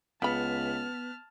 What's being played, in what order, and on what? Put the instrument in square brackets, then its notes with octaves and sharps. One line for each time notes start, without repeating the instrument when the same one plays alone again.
[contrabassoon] C#2 [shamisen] C#3 B5 [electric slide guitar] B3 [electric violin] A5 F6